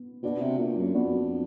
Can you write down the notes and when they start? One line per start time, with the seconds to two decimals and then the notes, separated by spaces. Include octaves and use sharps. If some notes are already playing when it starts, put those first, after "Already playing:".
Already playing: B3
0.23 B2 B3 D4 F#4
0.41 C3
0.58 A#2
0.76 F#2
0.94 F2 B3 D4 F#4